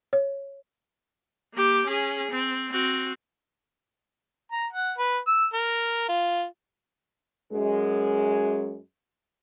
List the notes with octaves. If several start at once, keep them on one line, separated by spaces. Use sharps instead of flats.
C#5
A#3 G4
C#4 G#4
C4
C4 F#4
A#5
F#5
B4
E6
A#4
F4
F#2 G#3